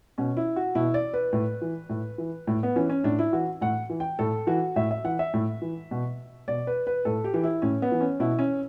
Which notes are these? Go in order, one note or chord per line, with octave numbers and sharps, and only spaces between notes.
B2 C#4
E4
F#4
B2 E4
D5
B4
A2
E3
A2
E3
A2
B3
E3 C#4
C#4
A2 D4
E4
E3 F#4
A2 F#5
E3
G5
A2 A4
E3 F#4
A2 E5
E5
E3 F#5
E5
A2
E3
B2
B2 D5
B4
B4
A2 A4
G4
E3
E4
A2 C#4
B3
E3
C#4
B2 E4
C#4